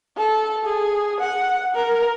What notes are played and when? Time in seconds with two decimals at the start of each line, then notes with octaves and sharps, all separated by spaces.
0.17 A4
0.65 G#4
1.20 F#5
1.74 A#4